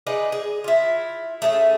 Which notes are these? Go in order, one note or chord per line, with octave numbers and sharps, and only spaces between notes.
D#4 G#4 B4 D5
G#4
E4 F4
A3 C#4 D4 G#4